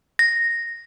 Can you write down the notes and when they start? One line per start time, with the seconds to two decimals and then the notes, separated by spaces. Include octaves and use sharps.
0.19 A#6